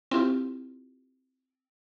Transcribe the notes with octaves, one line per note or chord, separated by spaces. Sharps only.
C4 E4 F4 G4